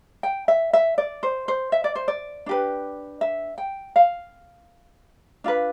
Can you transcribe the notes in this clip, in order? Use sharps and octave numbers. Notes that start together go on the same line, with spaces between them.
G5
E5
E5
D5
C5
C5
E5
D5
C5
D5
D4 G4 B4
E5
G5
F5
D4 F4 B4